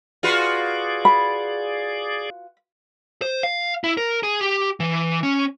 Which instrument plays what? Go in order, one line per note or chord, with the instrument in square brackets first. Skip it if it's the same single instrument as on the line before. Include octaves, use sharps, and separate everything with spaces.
[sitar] F4 F#4 B4 [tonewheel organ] G#4 D5
[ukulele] B5
[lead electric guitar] C5
F5
E4
A#4
G#4
G4
E3
C#4